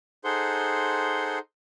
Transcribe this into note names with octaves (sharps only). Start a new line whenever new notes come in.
D#4 G#4 A4 C5 F#5 C6